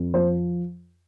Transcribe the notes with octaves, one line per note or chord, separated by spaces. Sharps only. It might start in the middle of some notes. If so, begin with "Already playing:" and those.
Already playing: F2
F3 C5